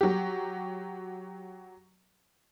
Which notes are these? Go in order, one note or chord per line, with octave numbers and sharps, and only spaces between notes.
F#3 G4